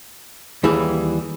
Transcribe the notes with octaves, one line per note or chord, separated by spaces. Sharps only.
D#2 E3 G3 G#4